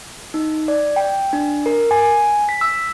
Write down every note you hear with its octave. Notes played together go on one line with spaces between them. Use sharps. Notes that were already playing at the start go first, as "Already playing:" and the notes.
D#4
D5
G5
D4
A#4
G#5
B6
E6